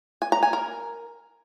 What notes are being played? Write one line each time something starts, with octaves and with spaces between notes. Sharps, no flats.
G#5
A#5
G#5
A#4